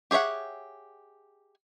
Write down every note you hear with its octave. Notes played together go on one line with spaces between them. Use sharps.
G4 G#4 C#5 E5 F#5